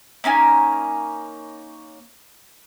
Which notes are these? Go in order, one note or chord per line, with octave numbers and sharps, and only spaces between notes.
A#3 C#4 D#4 G#5